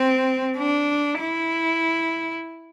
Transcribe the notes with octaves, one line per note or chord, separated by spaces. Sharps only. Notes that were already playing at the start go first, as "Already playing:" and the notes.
Already playing: C4
D4
E4